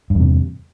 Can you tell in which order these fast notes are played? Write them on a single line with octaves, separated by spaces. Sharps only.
G2 E2 C3